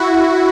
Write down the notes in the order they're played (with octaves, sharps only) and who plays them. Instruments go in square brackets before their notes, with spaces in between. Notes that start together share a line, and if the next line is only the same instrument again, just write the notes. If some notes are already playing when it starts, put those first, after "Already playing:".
Already playing: [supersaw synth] E4 F#4